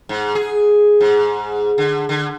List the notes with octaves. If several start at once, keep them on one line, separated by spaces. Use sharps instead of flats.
G#2
G#4
G#2
D3
D3